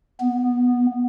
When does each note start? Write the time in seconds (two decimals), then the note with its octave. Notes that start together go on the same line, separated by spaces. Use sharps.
0.20 B3